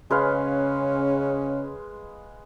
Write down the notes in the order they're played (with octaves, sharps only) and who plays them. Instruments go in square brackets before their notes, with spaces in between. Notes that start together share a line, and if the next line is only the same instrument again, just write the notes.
[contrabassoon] C#3 [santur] G#3 B4 F5 [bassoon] C#4